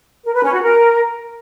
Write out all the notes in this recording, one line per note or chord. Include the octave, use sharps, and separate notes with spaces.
A#4
B4
C#4
F#4
A#4